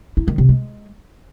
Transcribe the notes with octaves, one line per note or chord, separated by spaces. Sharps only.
E4
D#3
C3
G#3